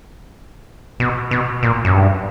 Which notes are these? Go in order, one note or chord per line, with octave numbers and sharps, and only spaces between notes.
B2
B2
A#2
F#2
G2